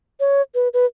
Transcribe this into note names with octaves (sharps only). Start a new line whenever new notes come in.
C#5
B4
B4